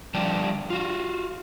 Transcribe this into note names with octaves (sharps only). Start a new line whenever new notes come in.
D3 F3 G3 D5 G5 A5
F4 F#4